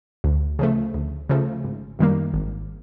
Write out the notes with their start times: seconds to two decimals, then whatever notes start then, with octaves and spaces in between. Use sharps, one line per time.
0.24 D2
0.59 C#3 F3 A3
0.94 D2
1.30 C#3 F3 A3
1.64 G#1
1.99 F#2 D#3 G3 A#3
2.34 G#1